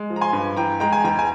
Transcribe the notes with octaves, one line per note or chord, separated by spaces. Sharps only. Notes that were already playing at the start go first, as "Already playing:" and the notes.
Already playing: G#3
F3
A#5
G#5 C6
G2
E3 G5 A#5
G#3 G5 A#5
G#5
E2 G5 A#5
G#5